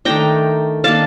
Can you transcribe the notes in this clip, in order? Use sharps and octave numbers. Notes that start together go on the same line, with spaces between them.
D#3 A3 D4 G5 A#5
D#3 A#3 D4 F5 A5